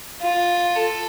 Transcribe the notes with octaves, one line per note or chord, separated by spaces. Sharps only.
F4
A4